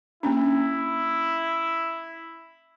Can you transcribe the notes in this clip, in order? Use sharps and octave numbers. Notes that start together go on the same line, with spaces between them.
A#3 C#4 D4 E4